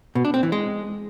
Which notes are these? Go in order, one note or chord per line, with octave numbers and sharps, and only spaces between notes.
B2
D4
C4
E3
G#3